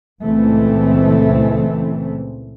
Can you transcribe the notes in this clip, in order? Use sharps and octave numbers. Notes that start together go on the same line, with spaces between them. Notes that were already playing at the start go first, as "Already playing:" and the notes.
C#2 A#2 C#3 E3 A3 C4